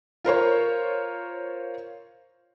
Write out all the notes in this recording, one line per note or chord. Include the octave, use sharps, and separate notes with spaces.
F4 A#4 C5 C#5